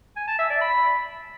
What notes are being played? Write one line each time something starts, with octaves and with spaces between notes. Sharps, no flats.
G#5
A5
E5
D5
B5